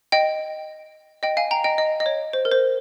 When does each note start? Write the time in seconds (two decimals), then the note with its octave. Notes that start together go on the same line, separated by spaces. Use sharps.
0.12 D#5 G5
1.23 D#5 G5
1.37 F5 G#5
1.51 G5 A#5
1.64 D#5 G5
1.78 D#5
2.00 D#5
2.06 C#5
2.33 C5
2.45 A#4
2.52 C5